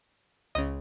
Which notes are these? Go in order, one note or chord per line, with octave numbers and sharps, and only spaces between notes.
C#2 C#3 D#5